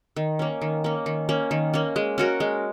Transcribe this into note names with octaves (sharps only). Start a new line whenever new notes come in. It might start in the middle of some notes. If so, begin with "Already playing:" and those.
D#3
A#3 C#4
D#3
A#3 C#4
D#3
A#3 C#4
D#3
A#3 C#4
G#3
C#4 F#4 A#4
G#3